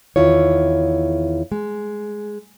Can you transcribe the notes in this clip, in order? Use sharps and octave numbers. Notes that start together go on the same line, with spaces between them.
E2 D#3 E4 F4 C#5
G#3